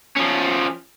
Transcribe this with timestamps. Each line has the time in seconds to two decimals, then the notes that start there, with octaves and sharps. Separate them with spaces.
0.17 F3 C#4